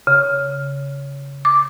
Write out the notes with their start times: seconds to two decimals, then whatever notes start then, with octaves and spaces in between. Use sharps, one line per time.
0.07 C#3
1.45 D6